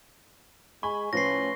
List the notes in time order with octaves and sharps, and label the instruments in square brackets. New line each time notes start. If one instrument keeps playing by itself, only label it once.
[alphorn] G#3 [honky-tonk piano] G#5 B5 [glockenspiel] C#6
[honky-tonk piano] A2 F3 [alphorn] C#4 [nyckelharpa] B4 C6 [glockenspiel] A#6 C7